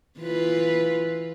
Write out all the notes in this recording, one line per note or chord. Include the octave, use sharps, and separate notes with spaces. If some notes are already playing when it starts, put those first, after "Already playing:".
E3 F4 B4